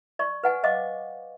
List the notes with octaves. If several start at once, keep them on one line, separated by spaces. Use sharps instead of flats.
D5 C#6
B4 F#5 G#5
C5 D#5 F5 D6